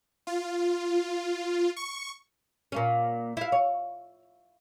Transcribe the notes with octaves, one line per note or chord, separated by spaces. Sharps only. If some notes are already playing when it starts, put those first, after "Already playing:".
F4
C#6
A#2 A#3 C#4
E4 F5
C#5